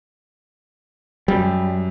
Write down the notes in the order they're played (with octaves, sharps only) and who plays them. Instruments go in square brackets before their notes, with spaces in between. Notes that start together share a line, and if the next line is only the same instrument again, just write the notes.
[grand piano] F#2 [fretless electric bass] G3